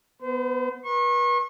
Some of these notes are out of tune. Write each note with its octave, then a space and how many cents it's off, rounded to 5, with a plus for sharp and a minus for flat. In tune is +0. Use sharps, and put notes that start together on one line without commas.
B3 +0 C5 -40
B4 -35 C#6 -40